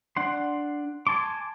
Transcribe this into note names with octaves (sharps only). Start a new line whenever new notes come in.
D4 F#5 C6
G#5 A5 C6 D6